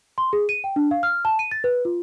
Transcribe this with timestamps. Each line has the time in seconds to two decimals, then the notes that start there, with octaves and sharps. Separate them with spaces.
0.18 C6
0.33 G#4
0.49 D#7
0.64 G5
0.76 D4
0.91 F5
1.03 F6
1.25 A5
1.39 D#7
1.51 A6
1.64 B4
1.85 F4